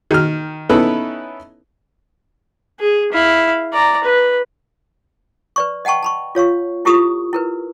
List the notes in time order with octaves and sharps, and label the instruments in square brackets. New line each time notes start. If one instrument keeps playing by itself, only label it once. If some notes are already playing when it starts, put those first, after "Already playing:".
[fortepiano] D#3 F6
B3 C#4 D#4 E4 A4 B4
[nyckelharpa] G#4
E4 F5
D5 A#5
B4
[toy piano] B4 D5 C#6
D#5 F#5 G5 A5 C#6
A5 B5 C#6
F4 C#5 F5 C#6
E4 F4 G4 A4 C#6 D#6
E4 A#4 B4